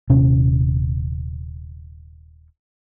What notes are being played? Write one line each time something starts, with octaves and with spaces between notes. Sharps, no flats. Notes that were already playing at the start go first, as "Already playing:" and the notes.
D#1 C3 C#4